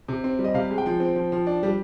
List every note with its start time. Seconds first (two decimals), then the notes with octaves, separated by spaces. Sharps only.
0.08 C3
0.24 C4
0.39 G3
0.44 D#5
0.54 C3 F5
0.70 G#3
0.78 G5
0.86 F3
1.00 C4
1.15 F3
1.32 F3
1.47 D4
1.63 G3